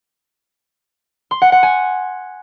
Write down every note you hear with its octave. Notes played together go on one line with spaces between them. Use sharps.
C6
F#5
F#5
G#5